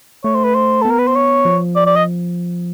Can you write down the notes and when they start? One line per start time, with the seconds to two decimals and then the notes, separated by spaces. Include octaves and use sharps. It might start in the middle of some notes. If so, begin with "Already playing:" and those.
0.24 A3 C#5
0.35 C5
0.45 B4
0.55 C5
0.82 B3 A4
0.91 A#4
0.99 B4
1.07 C5
1.15 C#5
1.45 F3
1.76 D5
1.86 D5
1.96 D#5